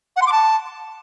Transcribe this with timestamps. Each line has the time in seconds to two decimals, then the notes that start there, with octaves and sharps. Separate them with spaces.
0.16 F#5
0.22 C6
0.27 D6
0.32 A5